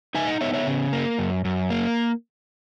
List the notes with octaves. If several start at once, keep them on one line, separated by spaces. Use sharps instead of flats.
D#4 E5 G#5
D#5 F#5
B3 C#5 E5
C#5 E5
C#3
A#3
F#2
F#2
A#3